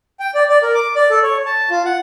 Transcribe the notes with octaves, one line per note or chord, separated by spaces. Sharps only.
G5
D5
D5
A#4
D6
D5
A4
C#5
A5
F4
F#5